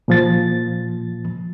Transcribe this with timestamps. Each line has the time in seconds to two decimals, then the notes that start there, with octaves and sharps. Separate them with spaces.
0.08 A#2 F3 A6